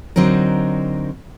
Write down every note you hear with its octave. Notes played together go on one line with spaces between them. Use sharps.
D3 F#3 C4 D#4 A#4